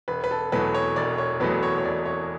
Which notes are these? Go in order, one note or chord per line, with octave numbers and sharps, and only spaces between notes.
E1 B4
B4
A4
E2 B2 F#3 A3 B4
C#5
E1 D5
C#5
E2 B2 F#3 A3 B4
C#5
C#5
E1 D5
C#5